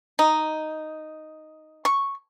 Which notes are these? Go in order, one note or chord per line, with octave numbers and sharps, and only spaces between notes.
D#4
C#6